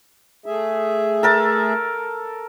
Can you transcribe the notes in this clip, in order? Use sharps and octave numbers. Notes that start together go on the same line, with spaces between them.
A3 G#4 E5
A4 A#4 A5